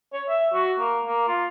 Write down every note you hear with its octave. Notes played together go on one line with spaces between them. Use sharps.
C#5
E5
F#4
A#3
A#3
F4